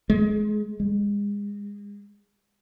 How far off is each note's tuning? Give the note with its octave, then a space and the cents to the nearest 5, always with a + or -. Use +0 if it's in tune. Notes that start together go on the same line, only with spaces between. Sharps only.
G#3 +25
G#3 -30